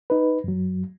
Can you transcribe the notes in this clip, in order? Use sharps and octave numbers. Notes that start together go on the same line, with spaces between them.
D#4 B4
F#2 F#3